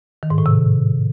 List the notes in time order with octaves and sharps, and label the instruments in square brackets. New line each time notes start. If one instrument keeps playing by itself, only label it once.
[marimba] D#3
G#2
A2
C3